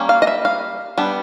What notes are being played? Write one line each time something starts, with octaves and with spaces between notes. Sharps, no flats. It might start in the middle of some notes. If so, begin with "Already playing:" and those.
Already playing: G3 A#3 C#4
F5
D#5
E5
F5
G3 B3 D4